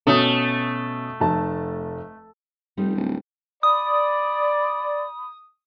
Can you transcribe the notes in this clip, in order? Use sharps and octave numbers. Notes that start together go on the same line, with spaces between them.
B2 A3 C#4 D#6
F1 A5
F1 G3 C4 D#4
D1
D5 B5 D#6